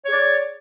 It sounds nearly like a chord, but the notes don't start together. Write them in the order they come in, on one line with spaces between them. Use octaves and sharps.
C#5 G#4 D5